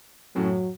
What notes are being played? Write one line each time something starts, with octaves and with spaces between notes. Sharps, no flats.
F#2 A2 F#3